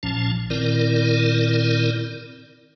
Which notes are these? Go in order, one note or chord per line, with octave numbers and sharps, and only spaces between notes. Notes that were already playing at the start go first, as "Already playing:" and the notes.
A#1 A#2 F3 C#4 A5
A#2 D#3 C4 E4 A#4 D5